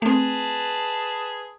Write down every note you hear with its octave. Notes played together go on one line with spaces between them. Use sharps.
A3 C4 G#4 B4 A5